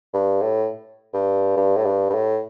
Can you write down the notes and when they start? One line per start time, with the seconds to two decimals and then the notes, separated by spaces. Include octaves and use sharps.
0.14 G2
0.42 A2
1.14 G2
1.57 G2
1.77 A2
1.85 G2
2.10 G2
2.14 A2